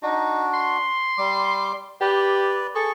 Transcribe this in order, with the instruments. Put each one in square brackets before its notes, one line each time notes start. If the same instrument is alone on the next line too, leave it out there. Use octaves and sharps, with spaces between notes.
[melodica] D4 F#4 [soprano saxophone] D#4
[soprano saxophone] C6
[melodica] G3 D6
[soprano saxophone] G4 [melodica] B4 D5
[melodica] G#4 C#6 [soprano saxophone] A4